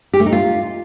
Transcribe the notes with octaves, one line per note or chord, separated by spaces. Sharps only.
G4
A3
D#4
F4